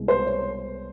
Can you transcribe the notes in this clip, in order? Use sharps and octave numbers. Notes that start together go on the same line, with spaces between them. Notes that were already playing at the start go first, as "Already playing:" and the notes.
Already playing: C2 B2 G#3
C5
C#5